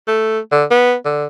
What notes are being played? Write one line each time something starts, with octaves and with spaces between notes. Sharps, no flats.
A3
D3
B3
D3